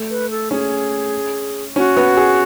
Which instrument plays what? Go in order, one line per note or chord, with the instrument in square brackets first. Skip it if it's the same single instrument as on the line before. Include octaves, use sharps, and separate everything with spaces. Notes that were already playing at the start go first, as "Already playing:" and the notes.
Already playing: [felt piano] A3
[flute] B4
A4
[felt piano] C#4 [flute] G#4
[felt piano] C#4 [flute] F#4
[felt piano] B3
G#4